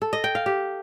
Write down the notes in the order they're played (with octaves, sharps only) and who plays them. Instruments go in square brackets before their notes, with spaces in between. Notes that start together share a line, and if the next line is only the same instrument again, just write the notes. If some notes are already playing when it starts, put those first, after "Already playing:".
[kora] A4
D#5
G5
F5
G4